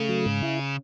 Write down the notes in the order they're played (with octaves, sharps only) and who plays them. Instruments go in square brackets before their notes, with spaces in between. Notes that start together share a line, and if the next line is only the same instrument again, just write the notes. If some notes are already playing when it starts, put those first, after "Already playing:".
Already playing: [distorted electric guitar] C#3 [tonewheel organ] A3
[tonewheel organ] F#3
G#2
E4